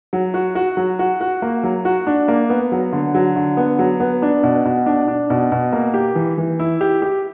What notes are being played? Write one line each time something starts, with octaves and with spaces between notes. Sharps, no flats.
F#3
F#4
F#4
F#3
F#4
F#4
A#3
F#3
F#4
D4
A#3
B3
F#3
D3
F#3
D3
B3
F#3
B3
D4
B2
B2
D4
D4
B2
B2
A#3
G4
E3
E3
E4
G4
G4